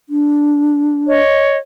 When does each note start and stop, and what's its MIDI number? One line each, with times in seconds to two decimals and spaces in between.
0.09 1.19 62
1.08 1.56 73
1.08 1.56 75